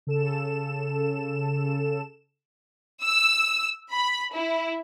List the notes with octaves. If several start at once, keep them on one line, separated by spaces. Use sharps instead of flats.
C#3 A4 E7
E6
B5
E4